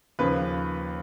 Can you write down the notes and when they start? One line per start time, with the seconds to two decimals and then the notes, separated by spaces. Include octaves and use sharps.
0.19 D#2 C#3 F3 B4